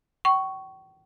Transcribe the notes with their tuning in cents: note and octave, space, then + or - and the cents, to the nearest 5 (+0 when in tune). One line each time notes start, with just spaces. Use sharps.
G5 -40 C#6 +0